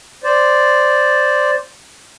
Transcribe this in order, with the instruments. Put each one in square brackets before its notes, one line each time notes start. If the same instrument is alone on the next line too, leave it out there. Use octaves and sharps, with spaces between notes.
[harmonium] C5 D5